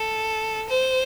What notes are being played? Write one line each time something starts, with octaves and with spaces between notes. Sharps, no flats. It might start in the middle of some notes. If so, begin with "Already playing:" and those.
Already playing: A4
C5